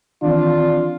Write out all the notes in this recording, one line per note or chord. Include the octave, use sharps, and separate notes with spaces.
D#3 E3 C4 D4 F4